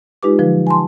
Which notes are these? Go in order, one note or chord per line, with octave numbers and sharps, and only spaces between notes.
G#3 D#4 F4 G4 B4 D6
D3 F3 F#3 B4
G#5 A5 C6